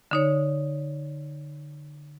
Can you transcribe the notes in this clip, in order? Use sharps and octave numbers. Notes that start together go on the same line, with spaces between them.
D3 D#4 C#5